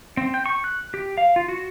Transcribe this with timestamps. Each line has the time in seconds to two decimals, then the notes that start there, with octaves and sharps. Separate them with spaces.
0.17 C4
0.34 G5
0.46 C#6
0.64 F#6
0.94 G4
1.18 F5
1.36 F4
1.48 F#4